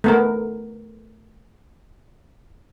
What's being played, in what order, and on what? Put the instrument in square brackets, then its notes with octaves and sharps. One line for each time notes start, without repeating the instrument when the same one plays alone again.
[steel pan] A3 B3 A#4